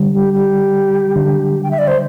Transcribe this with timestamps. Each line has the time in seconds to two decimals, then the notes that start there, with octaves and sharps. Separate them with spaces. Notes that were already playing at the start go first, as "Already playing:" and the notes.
Already playing: D3 G3
0.14 G4
0.34 G4
1.16 D3
1.63 G5
1.71 E5
1.79 D5
1.88 C5